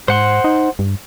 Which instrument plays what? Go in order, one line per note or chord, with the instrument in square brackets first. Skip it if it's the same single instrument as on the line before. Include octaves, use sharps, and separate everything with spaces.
[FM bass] G#2 [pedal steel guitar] C5 F#5 C6
[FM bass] D#4
G2